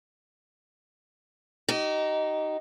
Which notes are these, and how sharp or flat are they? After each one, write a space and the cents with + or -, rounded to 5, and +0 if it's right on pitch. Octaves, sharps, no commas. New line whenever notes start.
D#4 +0 G4 -35